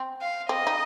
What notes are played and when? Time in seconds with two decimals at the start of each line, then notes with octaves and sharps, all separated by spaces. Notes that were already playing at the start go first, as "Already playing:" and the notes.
Already playing: C4
0.21 F5
0.49 C4 D#5
0.67 D#4